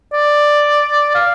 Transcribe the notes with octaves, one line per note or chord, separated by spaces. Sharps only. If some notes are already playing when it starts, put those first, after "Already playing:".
D5
F5